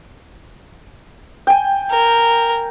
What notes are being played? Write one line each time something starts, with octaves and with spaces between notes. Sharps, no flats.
G5 G#5
A#4